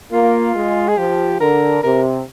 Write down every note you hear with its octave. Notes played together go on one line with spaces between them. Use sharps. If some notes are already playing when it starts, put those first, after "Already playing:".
A#3 F4
G#3
G#4
F3 G4
D3 A#4
C3 A#4